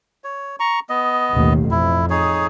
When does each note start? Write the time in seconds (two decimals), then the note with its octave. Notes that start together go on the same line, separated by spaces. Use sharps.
0.24 C#5
0.60 A#5 C#6
0.90 B3 D#5
1.33 A1 D#2 B2
1.71 F2 E4
2.10 D#4 G#4 C#5